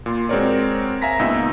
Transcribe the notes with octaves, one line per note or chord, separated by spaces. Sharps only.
A#2 C6
G#3 C4 F#4 A#4 C#5 D5
E5 F5 G#5 A#5 A#6 B6
C#2 A#2 B3 D#4 E6